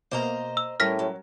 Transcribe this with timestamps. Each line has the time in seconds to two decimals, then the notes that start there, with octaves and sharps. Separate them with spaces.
0.11 B2 A#3 C5 D#5 A#5
0.57 E6
0.80 A2 G3 C#4 A#4 F6 A#6 B6
0.99 F#3